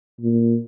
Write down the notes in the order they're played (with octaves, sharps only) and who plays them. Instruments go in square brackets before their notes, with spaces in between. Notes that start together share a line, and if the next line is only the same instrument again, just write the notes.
[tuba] A#2